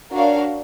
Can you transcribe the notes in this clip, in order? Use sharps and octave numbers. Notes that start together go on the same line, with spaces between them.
D4 F#4 A#4 C#5 F5